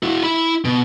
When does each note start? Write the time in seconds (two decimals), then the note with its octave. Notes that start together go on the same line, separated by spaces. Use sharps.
0.03 E4 F#4
0.24 E4 B5
0.65 B2